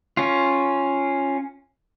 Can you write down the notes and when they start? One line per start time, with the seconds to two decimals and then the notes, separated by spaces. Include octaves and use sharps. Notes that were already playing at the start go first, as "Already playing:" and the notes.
0.17 C#4 F4